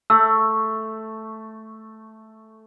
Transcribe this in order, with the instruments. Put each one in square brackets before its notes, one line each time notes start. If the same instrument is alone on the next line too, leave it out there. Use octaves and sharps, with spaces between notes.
[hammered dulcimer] A3 [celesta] E6